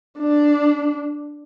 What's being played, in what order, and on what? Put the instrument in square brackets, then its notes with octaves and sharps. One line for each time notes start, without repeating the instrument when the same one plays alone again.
[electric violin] D4